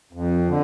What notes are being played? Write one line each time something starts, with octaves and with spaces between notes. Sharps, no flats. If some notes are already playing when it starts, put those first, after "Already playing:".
F2
D3